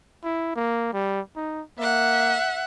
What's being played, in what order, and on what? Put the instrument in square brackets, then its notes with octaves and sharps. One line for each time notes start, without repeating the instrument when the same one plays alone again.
[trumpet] E4
A#3
G3
D#4
[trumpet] A#3 [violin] E5 F#5